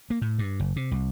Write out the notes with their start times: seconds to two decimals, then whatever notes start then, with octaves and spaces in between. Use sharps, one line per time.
0.10 A#3
0.22 A2
0.39 G2
0.60 F#1
0.76 C3
0.91 C2